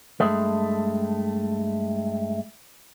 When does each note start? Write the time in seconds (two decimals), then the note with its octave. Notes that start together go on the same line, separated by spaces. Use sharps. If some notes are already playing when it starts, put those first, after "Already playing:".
0.20 G2 G#3 A3